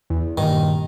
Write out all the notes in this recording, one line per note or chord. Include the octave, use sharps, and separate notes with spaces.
E2
G2 A#2 D#3